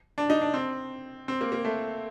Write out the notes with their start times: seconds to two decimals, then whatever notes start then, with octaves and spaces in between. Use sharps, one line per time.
0.18 D4
0.30 D#4
0.41 D4
0.54 C4
1.28 C4
1.41 A#3
1.52 A#3
1.65 A3